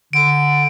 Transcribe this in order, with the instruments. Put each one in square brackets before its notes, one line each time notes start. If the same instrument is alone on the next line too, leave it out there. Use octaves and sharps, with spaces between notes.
[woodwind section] D3 [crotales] D7